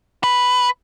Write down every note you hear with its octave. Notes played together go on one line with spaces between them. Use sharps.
B4